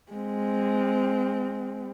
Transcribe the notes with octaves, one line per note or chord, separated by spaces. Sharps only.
G#3 C4